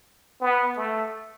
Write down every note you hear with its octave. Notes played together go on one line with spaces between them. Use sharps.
B3
A3